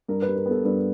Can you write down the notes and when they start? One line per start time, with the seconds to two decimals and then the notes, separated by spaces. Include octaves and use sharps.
0.08 G2 A#4
0.22 B4
0.28 G3
0.36 A#4
0.46 B3
0.51 A4
0.65 G2 B4